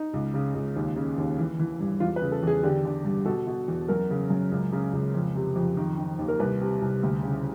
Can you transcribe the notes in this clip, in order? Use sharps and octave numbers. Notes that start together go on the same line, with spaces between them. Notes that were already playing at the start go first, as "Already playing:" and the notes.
Already playing: D#4
C#2
C#3
C#2
D#2
C#3
D#2
E3
E3
G2
E2 F4
B4
C#3
A4
E2 G#4
D3 G4
D3
G2
B2 A4
B2
E2
F#2 A#4
C#3
F#2
C#2
C#3
C#2
F2
C3
F2
D#3
D#3
D#2
A#4
C2 B4
C3
C2
D2
C#3